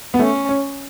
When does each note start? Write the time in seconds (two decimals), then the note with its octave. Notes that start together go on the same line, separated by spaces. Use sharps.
0.14 B3
0.19 A3 C#4
0.49 C#4